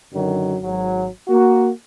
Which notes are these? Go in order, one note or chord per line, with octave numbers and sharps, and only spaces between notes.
F#2 D3 D#3 F#3
G#1 F#3
A#3 F#4